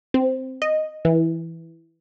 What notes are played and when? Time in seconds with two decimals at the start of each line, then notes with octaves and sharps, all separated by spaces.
0.14 C4
0.62 D#5
1.05 E3